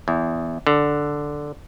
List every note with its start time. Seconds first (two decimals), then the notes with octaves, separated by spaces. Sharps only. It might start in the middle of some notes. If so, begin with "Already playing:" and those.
0.08 E2
0.67 D3